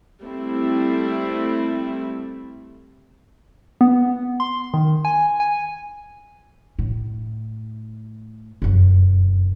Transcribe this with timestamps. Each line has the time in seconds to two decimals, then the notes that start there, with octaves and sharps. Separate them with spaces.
0.22 G3 A3 C4 E4
3.81 B3
4.40 C6
4.74 D#3
5.05 G#5
5.40 G#5
6.79 A2
8.62 F1 F#2